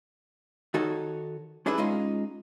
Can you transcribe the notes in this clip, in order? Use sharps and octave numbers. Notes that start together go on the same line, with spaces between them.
D#3 D#4 F#4 A4 C#5
C#4 D4 E4 G#4 B4
G#3 C#4 D#4 F4